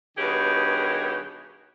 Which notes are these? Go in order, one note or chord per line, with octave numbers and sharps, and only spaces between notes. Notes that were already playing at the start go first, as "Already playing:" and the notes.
G2 B2 D#3 G4 G#4 C#5